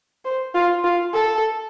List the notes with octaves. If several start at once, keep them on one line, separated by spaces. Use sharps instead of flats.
C5
F4
F4
A4